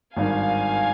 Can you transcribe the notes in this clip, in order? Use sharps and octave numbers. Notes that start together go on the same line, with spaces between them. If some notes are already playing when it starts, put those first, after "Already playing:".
G#1 G2 D#3 F5 G#5